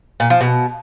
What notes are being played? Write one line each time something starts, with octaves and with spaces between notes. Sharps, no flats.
A#2
F3
B2